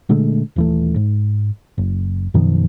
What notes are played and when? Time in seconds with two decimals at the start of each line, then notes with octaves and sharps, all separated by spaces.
0.09 A#2 D3 G#3 A3
0.56 D#1 E3 A3
0.96 G#2
1.78 F#1
2.34 F#2 B2 D#3 F3